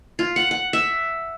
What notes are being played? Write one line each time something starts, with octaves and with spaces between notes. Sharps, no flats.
F4
F#5
F#5
E5